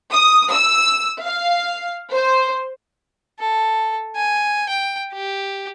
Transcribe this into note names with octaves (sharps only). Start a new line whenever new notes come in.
D#6
E6
F5
C5
A4
G#5
G5
G4